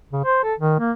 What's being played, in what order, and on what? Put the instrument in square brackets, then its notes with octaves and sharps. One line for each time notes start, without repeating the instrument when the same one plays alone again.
[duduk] C#3
C5
A4
D#3
A#3